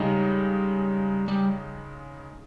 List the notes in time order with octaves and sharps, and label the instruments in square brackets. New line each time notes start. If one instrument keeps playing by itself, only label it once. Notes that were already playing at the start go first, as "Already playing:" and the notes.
Already playing: [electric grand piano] C#3 G#3 D#4 [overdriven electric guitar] G3
[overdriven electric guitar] G3